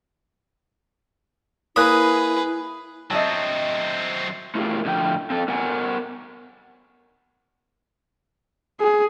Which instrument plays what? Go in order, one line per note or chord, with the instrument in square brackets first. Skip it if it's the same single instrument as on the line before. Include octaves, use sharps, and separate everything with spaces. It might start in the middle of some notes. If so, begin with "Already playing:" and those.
[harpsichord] A#3 C#5 B5 [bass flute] E4 [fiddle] G#4 B4 [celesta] D#6 F#6
[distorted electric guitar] F#3 C4 [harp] D#5 E5 A5
[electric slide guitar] A3 E4 F4 G4 G#4 A#4
A2 D3 F3 G5
C4 A4
B3 A#4 F#5 G#5
[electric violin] G#4